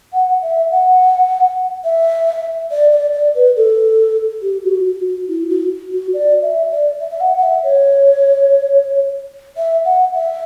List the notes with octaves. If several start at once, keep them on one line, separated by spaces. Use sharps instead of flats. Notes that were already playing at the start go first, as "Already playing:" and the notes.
F#5
E5
F#5
E5
D5
D5
D5
B4
A4
G4
F#4
F#4
F#4
E4
F#4
F#4
D5
E5
D5
E5
E5
F#5
F#5
E5
C#5
E5
F#5
E5